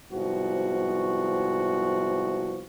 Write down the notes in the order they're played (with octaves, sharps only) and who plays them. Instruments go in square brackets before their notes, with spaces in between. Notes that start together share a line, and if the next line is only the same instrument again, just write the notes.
[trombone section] C2 G#2 F3 B3 F#4